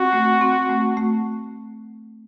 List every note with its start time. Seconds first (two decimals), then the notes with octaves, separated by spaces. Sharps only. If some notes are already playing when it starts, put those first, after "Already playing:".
Already playing: C4 F#4
0.13 A3
0.41 C4
0.69 A3
0.97 A3